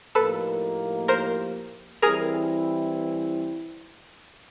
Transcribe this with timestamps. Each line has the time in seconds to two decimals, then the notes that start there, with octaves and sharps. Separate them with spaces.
0.15 A2 F3 A#3 D#4 G4 A4 B4
1.08 A#4 C5
2.02 E3 G3 C4 E4 G#4 A#4